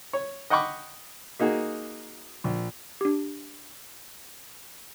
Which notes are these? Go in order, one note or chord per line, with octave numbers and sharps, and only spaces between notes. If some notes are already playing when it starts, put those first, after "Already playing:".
C#5
D#5 F#5 G5 B5 C#6 D6
A#3 D#4 F#4 G#4
A#1
D4 G4